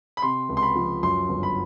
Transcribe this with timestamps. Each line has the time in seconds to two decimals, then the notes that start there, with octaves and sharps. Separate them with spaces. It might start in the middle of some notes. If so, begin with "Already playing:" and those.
0.17 B5
0.22 C3 C6
0.49 C#2
0.57 C6
0.62 B5
0.75 F3
1.03 F#2 C6
1.29 G1
1.43 B5